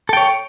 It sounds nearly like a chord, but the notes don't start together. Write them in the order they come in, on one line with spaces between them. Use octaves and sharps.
A4 G5 C#5